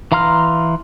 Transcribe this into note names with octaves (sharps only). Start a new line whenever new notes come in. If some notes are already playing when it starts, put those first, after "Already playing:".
E3 F5 A#5 C6 F6